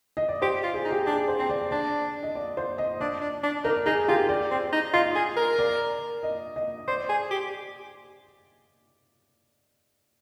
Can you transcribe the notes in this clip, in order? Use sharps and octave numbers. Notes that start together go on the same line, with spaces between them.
D#5
D5
G4 C5
F4
G#4
D#4
G4
D4 G#4
C5
C4
D5
D4 D5
D#5
D5
C5
D#5
D4 D5
D4
D4
D#4 A#4
D#4 G#4
F4 G4
D5
C4
D#4
F4 D#5
G#4
A#4
D5
D#5
D#5
C5 D5
G#4
G4